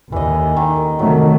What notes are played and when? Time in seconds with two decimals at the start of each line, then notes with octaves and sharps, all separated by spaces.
0.12 D#2 E3 D#5
0.57 D#3
0.99 C3 D#3 F#3 A3